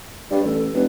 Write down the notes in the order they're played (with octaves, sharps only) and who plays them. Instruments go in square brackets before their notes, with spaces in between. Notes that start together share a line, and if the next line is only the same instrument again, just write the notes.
[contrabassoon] G2 [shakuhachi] D5
[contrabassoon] A1 [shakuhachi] A4
[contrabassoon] F1 [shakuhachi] B4